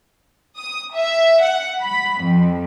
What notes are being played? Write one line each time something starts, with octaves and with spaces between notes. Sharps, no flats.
D#6
E5
F#5
B5
F2